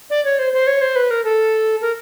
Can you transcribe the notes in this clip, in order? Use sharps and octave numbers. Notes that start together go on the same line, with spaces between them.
D5
C#5
C5
C5
C#5
C5
B4
A#4
A4
A#4